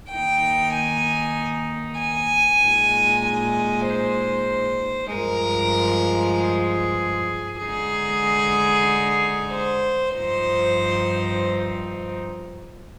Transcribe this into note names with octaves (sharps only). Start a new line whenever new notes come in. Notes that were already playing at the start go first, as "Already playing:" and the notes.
D#3 A#3 D#4 G5
G#5
G#5
A#2 G#3 D#4
G#5
C5
G2 F3 G#3 A#4
G#4
D3 G#3 D#4 G#4
C5
G2 F3 C4 D#4 C5